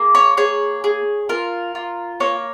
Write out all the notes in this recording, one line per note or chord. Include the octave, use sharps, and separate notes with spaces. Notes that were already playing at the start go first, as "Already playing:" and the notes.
Already playing: A#3 G#4
C#5
G#4 C#5
G#4
F4 A#4
F4
A#3 C#5